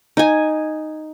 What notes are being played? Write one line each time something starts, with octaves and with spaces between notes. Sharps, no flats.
D#4 G#5